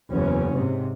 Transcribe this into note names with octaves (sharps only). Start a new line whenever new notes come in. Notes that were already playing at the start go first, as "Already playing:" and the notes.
F#1 E2 C#4
G#2 C3